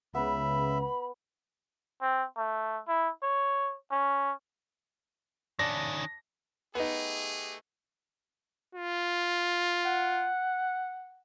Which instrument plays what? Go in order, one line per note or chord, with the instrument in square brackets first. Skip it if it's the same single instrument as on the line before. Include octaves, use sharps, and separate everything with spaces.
[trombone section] C#2 C#3 [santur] B3 B4 [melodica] E5 [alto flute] B5
[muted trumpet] C4
A3
E4
C#5
C#4
[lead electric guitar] D#3 C#4 [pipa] D4 [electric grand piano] A#6
[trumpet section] A3 G4 G#4 [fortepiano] B3 D#4
[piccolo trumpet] F4
[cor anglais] F#5